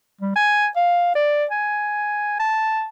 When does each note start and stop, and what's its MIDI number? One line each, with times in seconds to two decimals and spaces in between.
0.21 0.34 55
0.36 0.68 80
0.76 1.13 77
1.15 1.45 74
1.51 2.38 80
2.40 2.86 81